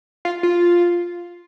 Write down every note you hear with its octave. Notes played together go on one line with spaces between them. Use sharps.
F4
F4